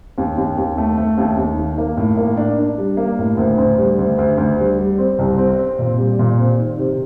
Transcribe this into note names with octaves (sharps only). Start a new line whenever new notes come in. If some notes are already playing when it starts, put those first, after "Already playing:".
D#2
D#2
D#2
A3
A3
D#2
D#2
D#3
A#3
A2
A#3
D4
D4
G3
A#3
A2
D2
D2
G3
D2
D2
D2
G3
G3
C4
C2
C4
C4
A#2
G3
A#2
C4
D#3
C3